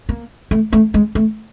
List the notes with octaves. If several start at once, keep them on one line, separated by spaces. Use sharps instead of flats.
A#3
A3
A3
G#3
A3